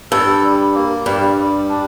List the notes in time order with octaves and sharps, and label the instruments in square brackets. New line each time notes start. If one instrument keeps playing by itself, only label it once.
[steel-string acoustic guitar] G2 [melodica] A4
[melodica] G3
A#3
[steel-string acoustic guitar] G2 [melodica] G3
[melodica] G3
D4